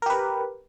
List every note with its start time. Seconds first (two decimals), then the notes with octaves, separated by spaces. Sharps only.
0.02 A#4
0.06 G4
0.10 B4